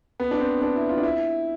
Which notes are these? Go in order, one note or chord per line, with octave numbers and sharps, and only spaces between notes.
B3
D4
C4
D4
E4
F4
D4
E4